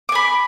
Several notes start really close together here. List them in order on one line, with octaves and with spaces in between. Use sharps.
D6 G#5 B5